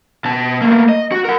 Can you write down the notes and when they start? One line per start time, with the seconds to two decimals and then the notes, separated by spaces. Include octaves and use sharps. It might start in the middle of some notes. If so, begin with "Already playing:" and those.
0.25 B2 A5
0.61 A3 A#3
0.89 D#5
1.11 F#4
1.25 A#4 F#5